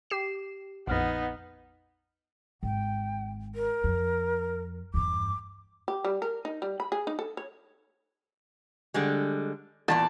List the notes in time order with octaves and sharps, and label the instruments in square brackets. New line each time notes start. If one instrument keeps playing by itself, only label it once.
[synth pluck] G4 C7 E7
[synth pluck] A#1 F2 [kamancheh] B3 D#4 [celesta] F#5 F6 A#6
[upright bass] G#1 [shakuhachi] G5
[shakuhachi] A#4
[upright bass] F2
[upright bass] E2 G2 [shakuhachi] D6
[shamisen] G4
G3
A#4
D#4
G3
B5
G#4
D#4
A4
C#5
[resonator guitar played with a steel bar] D3 G3 G#3
[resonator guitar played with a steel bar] E2 A#2 D5 [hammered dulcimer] A5